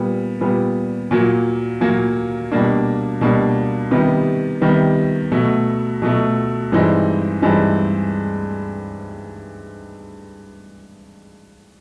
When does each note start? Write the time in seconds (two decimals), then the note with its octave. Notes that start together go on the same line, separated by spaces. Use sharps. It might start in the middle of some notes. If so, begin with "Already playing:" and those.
Already playing: A#2 G3 B3
0.41 A#2 G3 B3
1.11 A#2 F#3 A#3
1.81 A#2 F#3 A#3
2.52 B2 G3 A#3 D4
3.21 B2 G3 A#3 D4
3.91 C3 D#3 G3 B3
4.61 C3 D#3 G3 B3
5.32 B2 F#3 A3
6.02 B2 F#3 A3
6.72 G2 E3 G#3 C4 D#4
7.42 G2 E3 G#3 C4 D#4